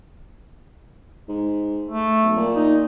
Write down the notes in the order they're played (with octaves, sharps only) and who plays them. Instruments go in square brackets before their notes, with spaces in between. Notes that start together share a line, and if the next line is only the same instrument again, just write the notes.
[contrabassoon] G#2
[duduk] A3
[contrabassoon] B1
A#2
[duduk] D#4